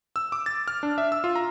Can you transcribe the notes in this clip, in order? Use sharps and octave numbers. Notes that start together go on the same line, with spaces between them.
E6
D6
A6
F6
D4
E5
E6
F4
A#5